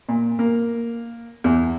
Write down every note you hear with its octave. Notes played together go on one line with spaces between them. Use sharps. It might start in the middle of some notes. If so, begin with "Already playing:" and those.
A#2
A#3
E2